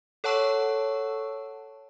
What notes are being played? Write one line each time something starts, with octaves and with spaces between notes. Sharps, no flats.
A4 C#5 F#5 A5 C#6 E6